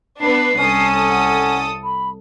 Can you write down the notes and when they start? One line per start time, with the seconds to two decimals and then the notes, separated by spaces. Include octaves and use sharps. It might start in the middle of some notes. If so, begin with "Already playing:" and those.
0.21 B3 D4 B4 C7
0.60 C2 C#4 A4 D#6
1.10 F#5
1.84 B5